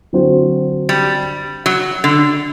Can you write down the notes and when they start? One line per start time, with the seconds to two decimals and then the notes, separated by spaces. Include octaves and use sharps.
0.13 D3 F#3 C4 F#4 C5
0.89 G3
1.66 F#3
2.04 D3